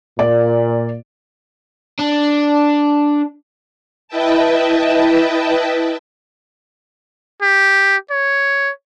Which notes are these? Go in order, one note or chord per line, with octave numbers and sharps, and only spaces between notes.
A#2 D5
D4
E4 B4 D#5 E5 G5 A5
G4
C#5